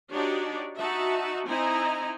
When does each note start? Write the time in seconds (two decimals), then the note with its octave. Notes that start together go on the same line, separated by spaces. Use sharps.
0.11 D4 D#4 F#4 G4 C#5 D5
0.79 D#4 F#4 E5 A5
1.46 C4 D#4 E4 D#5 G#5 A#5